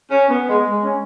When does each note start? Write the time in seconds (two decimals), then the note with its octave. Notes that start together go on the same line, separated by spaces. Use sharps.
0.10 C#4
0.29 B3
0.48 G#3
0.66 G#3
0.83 C#4